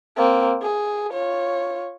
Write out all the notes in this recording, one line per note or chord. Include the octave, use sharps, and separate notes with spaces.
A#3 C4
G#4
F4 C#5